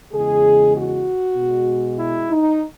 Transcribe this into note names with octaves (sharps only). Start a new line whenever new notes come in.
E2 C#3 G#3 G#4
F#4
B2 G#3
E4
D#4